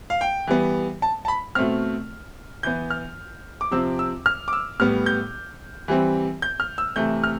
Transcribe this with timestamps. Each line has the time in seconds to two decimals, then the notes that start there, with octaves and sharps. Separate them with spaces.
0.10 F5
0.21 G5
0.47 E3 G3 B3
1.02 A5
1.25 A5
1.28 B5
1.55 B2 A3 C4 F6
2.63 E3 B3 G6
2.90 F6
3.61 D6
3.71 C3 F3 C4 E6
3.99 E6
4.26 F6
4.48 D6
4.53 E6
4.80 A2 G3 B3 F6
5.06 G6
5.88 E3 G3 C4
6.42 G6
6.60 F6
6.78 E6
6.96 C3 E3 A3 G6
7.24 F6